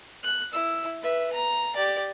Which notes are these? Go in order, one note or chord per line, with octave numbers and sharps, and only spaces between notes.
F#6
E4 E6
B4 E5
A#5
G4 D5